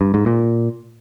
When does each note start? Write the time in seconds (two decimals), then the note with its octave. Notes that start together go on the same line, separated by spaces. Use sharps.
0.01 G2
0.14 G#2
0.26 A#2